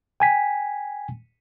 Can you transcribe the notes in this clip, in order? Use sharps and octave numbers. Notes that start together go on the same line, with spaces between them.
G5 G#5 B6